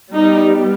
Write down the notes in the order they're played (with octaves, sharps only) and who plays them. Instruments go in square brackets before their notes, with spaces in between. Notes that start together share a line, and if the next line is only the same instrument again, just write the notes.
[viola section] G3 B3 D#4